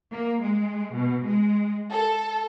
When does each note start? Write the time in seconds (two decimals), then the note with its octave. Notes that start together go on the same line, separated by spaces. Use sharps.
0.12 A#3
0.43 G#3
0.94 B2
1.26 G#3
1.91 A4